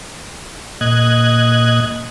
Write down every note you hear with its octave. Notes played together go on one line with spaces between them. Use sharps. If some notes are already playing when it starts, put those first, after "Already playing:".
A#2 D#5 F#6 G#6